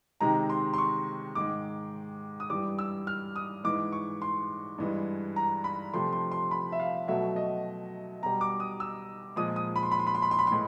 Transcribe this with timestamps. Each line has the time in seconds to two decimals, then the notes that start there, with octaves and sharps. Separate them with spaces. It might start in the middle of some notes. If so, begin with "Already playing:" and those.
0.20 C3 D#3 G#3 A#5
0.50 C6
0.74 C6
0.78 C#6
1.35 G#2 D#3 G#3 D6
2.40 D#6
2.50 G2 E3 G3 D6
2.79 E6
3.07 F6
3.36 D#6
3.64 G#2 E3 G#3 D6
3.92 C#6
4.22 C6
4.78 G2 E3 G#3
5.36 A#5
5.64 B5
5.94 C3 F3 A3 C6
6.13 C6
6.32 C6
6.51 B5
6.72 E5
6.80 F5
7.08 B2 F#3 A3 E5
7.36 D#5
8.22 B2 G3 A#5
8.41 D6
8.60 D#6
8.80 E6
9.36 A#2 F3 G#3 D#6
9.56 D#6
9.76 B5
9.83 C6
9.91 B5
9.99 C6
10.07 B5
10.15 C6
10.22 B5
10.31 C6
10.39 B5
10.47 C6
10.51 A2 E3 G#3